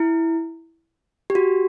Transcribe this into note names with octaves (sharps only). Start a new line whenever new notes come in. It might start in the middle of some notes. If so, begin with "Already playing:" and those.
Already playing: E4
G4
F#4